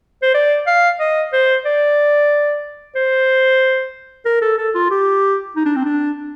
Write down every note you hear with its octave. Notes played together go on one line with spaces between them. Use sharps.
C5
D5
F5
D#5
C5
D5
C5
A#4
A4
A4
F4
G4
D#4
D4
C4
D4